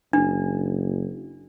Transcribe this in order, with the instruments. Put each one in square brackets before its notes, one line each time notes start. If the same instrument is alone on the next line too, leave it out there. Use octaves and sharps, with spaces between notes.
[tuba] F#1 [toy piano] D4